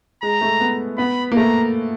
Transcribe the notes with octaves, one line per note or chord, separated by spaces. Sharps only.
G#3 A#5
A3
B3
B3 B5
A#3
A3 A#5